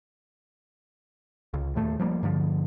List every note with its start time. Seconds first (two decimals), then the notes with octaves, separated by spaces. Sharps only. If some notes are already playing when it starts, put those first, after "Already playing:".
1.54 C#2
1.75 D#2 A2 A3
1.99 F3 G3 A3 A#3
2.23 G2 D3 F3